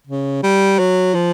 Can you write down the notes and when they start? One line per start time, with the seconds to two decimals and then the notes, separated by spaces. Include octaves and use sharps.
0.07 C#3
0.43 G3
0.79 F#3
1.14 F3